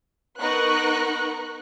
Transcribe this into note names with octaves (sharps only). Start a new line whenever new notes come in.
B3 D#4 A#4 C#6 F#6